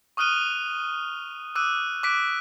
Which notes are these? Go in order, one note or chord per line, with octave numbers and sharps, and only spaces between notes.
C#6 D#6 F6 F#6 D#7 G7
D6 E6 F#6 D#7
D6 F#6 B6 D7